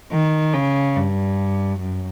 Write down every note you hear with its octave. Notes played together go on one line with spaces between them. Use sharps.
D#3
C#3
G2
F#2